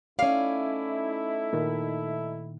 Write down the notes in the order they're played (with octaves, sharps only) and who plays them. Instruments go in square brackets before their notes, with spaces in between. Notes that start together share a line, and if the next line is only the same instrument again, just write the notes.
[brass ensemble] A3 D#4 E4 [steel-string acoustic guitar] C#4 D5 [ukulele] F5
[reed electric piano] A#2 D#3